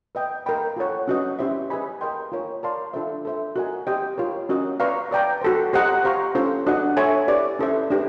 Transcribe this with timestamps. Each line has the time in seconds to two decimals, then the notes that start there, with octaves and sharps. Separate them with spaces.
0.15 B4 D#5 G5
0.46 A#4 D#5 G5 B5
0.76 F4 A4 C#5 F#5
1.08 C#4 F#4 B4 D#5
1.39 C#4 E4 G4 C5 E5
1.70 G#4 B4 D#5 G#5 B5
2.01 A#4 D#5 G5 C6
2.32 F4 A#4 C#5
2.63 A#4 D5 F5 A5 C6
2.93 D4 F4 A4 C5 E5
3.25 A4 C5 E5
3.56 F#4 A#4 D#5 G#5
3.87 G4 C5 D#5 G5
4.18 F4 A#4 C#5
4.49 C#4 F#4 A#4 D#5
4.80 B4 D5 F5 A#5 C#6
5.11 B4 D5 G5 A#5
5.42 F#4 A4 C5
5.73 G4 C5 D#5 F#5 A#5
6.04 G4 C5 F5 A#5 C#6
6.35 C#4 F4 A4 C5
6.67 D4 F#4 B4 D#5 F#5
6.97 A4 C#5 E5 G#5
7.28 E4 G4 B4 D5
7.59 C#4 E4 A4 C5 E5
7.90 D4 G4 B4